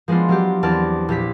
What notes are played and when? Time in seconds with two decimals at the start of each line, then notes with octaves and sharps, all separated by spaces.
0.08 F3 G#3 B3 D4 F4
0.29 F#3 F4 G4
0.63 E2 C4 D5 A5 F6
1.09 A#1 G4 B6